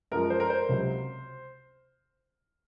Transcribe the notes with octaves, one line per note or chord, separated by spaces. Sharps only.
F#2 F3 G#3 A#4
C5
A#4
C5
C#2 C3 F#3